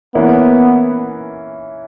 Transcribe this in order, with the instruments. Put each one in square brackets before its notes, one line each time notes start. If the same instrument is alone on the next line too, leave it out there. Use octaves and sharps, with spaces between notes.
[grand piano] E3 A#3 C#4 E4 [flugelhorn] B3